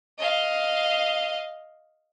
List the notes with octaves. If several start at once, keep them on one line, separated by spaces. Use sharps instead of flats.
D#5 F5